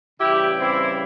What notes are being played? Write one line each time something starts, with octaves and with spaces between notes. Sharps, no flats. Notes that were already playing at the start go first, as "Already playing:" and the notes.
C#3 E3 G3 E4 G4
C4 E4